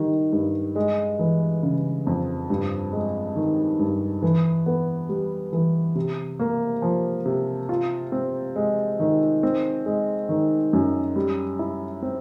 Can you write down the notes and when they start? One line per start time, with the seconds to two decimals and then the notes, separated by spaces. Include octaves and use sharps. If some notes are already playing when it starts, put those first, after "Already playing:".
Already playing: D#3 G3
0.33 G2
0.76 G#3
1.19 E3
1.63 C#3
2.07 F2
2.50 G2
2.93 G#3
3.35 D#3
3.79 G2
4.22 E3
4.66 B3
5.09 G3
5.53 E3
5.95 C3
6.40 A#3
6.82 F3
7.26 C3
7.69 F4
8.12 C4
8.56 G#3
9.00 D#3
9.43 C4
9.86 G#3
10.29 D#3
10.73 F#2
11.16 G3
11.59 E4
12.02 C4